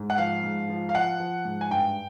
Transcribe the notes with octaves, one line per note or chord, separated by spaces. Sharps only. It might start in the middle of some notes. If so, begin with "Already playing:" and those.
Already playing: G#2
F#5
F3 F5
G#2
F3
F5
F3 F#5
F3
G#2
G#5
G2 G5